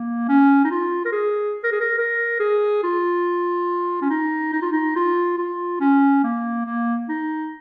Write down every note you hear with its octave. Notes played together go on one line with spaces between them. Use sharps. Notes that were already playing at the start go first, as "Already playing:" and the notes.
Already playing: A#3
C#4
D#4
F4
A#4
G#4
A#4
G#4
A#4
A#4
G#4
F4
C#4
D#4
D#4
F4
D#4
F4
F4
C#4
A#3
A#3
D#4